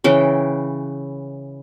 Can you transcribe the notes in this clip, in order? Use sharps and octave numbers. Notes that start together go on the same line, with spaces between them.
C#3 E3 G5